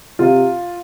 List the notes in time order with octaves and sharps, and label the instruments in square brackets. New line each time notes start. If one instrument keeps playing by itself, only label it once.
[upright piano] C3 F4